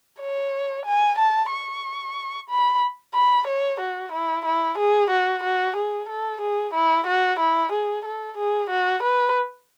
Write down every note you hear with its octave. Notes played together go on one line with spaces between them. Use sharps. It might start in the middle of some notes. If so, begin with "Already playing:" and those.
C#5
G#5
A5
C#6
B5
B5
C#5
F#4
E4
E4
G#4
F#4
F#4
G#4
A4
G#4
E4
F#4
E4
G#4
A4
G#4
F#4
B4